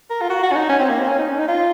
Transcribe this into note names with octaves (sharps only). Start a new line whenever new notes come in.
A#4
F4
F#4
F#4
C#4
D#4
C#4
C4
A#3
C4
C#4
D#4
C#4
D#4
F4